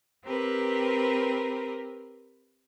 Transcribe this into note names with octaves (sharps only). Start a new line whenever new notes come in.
C4 G4 A#4 B4